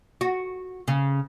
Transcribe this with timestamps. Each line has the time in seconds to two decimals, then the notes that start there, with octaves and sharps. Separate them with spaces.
0.21 F#4
0.88 C#3